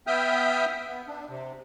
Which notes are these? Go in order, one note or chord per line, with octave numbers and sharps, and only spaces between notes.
B3 E5 G5 D#6 F6 G6
B3
D4
C3